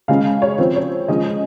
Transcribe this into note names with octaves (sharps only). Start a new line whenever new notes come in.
C#3 G#3 C#4 F5
C#5
F3 C4 C5
C#5
C#3 F3 G#3 C#4 D#5